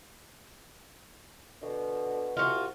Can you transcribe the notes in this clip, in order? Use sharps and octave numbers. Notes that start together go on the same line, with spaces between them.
B2 D3
C2 F4 F#4